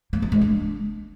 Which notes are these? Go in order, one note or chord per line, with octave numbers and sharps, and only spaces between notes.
A#3
D#4
G#3
D4